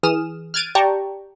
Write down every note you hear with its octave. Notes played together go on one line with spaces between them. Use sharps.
E3 G#4 D#6 F6 E7
F6 F#6 G#6 A6 D7 D#7
G4 D5 G5 A5 A#5 C#6